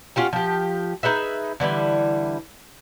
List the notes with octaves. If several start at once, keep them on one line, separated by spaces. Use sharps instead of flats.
C#4 F4 G4 F#5
F3 G4
D#4 G#4 B4 E5
D3 E3 G3 E4